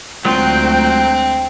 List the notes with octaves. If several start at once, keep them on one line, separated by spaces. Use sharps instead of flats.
D2 F#3 G#3 C4 F4 G5 A#5